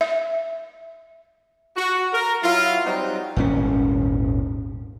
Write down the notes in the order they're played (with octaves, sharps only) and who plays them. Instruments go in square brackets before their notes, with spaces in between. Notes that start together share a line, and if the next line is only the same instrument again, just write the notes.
[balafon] E5
[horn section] F#4
A#4
F#3 E4 F4
F#3 G3 C4 D#4
[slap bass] D#1 G#1 C#4